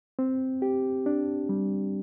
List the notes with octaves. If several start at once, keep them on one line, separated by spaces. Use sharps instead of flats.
C4
G4
D4
G3